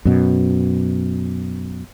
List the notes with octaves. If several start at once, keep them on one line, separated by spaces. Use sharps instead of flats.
F#2 B2